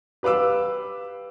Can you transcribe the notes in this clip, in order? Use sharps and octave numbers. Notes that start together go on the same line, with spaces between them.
G4 B4 F5 D6 E6